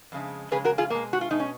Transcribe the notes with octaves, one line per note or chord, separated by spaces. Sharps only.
F2 C#3 G#3
F2 C#3 G#3 G#4 B4
F#4 A#4
F4 G#4
B2 G#3 A#3
F#4
F4
B2 G#3 D#4
C#4